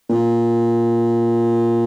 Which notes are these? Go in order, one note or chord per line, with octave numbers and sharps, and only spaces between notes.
A#2